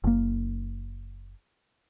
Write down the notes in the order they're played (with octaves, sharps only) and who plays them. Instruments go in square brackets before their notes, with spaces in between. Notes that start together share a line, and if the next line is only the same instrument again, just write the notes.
[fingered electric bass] F#1 A#3